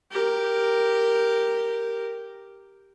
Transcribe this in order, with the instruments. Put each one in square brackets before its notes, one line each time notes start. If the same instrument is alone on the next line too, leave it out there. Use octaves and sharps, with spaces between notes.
[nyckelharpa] G4 A#4